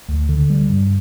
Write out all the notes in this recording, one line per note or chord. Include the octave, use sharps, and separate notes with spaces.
D2
D3
G3
G2